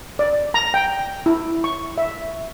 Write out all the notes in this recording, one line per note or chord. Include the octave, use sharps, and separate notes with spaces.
D5
A#5
G5
E4
C#6
E5